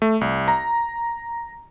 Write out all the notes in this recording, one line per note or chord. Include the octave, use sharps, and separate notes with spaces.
A3
C2
A#5